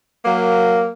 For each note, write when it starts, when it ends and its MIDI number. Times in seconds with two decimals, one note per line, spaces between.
0.24 0.88 54
0.24 0.88 58